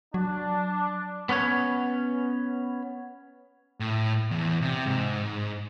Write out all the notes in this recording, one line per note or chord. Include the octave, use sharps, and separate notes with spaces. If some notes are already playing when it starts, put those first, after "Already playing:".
F#3 D4
B3 C#4 B4 C#5
A2
E2
C3
G#2